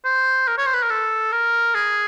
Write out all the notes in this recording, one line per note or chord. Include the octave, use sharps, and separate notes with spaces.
C5
A#4
C#5
C5
B4
A#4
A4
A#4
G#4